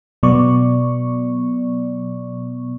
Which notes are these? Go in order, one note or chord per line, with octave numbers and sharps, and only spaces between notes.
B2 F#3 B3 D5 C#6